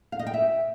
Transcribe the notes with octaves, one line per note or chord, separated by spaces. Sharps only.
F5
D#5
G5
E5